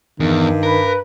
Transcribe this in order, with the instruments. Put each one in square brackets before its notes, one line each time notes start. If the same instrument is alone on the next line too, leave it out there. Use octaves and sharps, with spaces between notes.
[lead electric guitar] E2 [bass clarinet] G2 [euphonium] D#3
[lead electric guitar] A#4 [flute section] B4